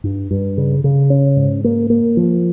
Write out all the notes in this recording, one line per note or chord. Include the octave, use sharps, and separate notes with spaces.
G2
G2
C#3
C#3
C#4
G#2
A#3
A#3
F3